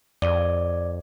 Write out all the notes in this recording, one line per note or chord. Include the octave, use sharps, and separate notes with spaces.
F2 D5